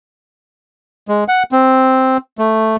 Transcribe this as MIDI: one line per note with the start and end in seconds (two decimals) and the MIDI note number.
1.08 1.24 56
1.28 1.43 78
1.52 2.17 60
2.39 2.76 57